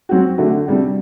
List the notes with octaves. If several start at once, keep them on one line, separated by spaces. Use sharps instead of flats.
F#3 C4 F#4
D3 A3 D4 F#4
C3 G3 D4 F#4